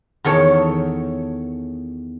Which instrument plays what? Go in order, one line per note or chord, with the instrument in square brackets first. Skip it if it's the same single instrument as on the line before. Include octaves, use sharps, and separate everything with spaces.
[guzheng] E2 D#3 A4 C#5 A5